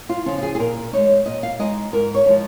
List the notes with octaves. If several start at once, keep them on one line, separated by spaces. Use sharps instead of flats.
F4
C#3 F3 F4
F4
G#4
G#4
A#2 A#4
G#3 D#4 C#5
A#2 D#5
F5
G#3 D#4 D#5
G#2 A#4
C#5
F3 G#3 D#4